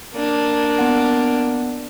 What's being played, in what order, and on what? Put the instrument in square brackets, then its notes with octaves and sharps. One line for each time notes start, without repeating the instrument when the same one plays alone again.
[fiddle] A#3 D4
[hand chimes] B3 F#5